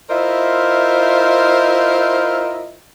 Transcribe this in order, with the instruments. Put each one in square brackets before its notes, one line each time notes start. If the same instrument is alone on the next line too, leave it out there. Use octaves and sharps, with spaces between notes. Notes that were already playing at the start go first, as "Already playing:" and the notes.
[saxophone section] E4 F4 A#4 C5 D#5 E5